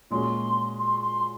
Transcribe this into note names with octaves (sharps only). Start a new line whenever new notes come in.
A#2 G#3 C#4 F#4 C6
C6
C6